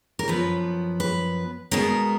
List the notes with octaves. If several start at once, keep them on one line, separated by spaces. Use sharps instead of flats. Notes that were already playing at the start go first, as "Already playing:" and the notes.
A#4
F#2 F3 B3 B4
B4
B2 G#3 B3 A#4